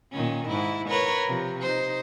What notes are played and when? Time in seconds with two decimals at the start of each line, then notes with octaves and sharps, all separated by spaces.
0.12 A#2 D#3 C#4
0.48 G#2 E4
0.89 A#4 B4 C#5
1.27 C3 F3
1.62 D#4 C5